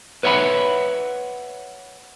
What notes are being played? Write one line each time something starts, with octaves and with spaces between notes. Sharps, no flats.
B4 C#5 E5 F#5 B5